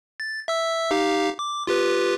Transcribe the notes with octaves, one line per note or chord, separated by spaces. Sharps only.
A6
E5 E6
D#4 G4 F5
D6
F4 G4 B4